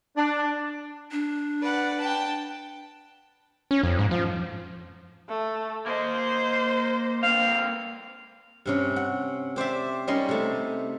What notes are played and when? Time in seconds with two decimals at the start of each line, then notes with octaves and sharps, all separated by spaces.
0.16 D4
1.11 D4
1.61 B4 D5 F#5
2.00 G5 A5
3.71 C#4
3.83 F2
3.99 G#2
4.11 F3
5.29 A3
5.87 A#3 C5 D#5
7.23 A#3 C4 F5
8.66 G2 C3 C#4
8.96 F#5
9.56 G4 C5 D5 E5
10.07 G3 A#3 C#4 D#4 D#5 C6
10.29 C3 A3